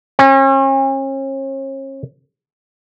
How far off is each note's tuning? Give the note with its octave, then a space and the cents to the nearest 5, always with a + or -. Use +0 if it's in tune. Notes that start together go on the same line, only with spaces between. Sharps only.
C#4 -40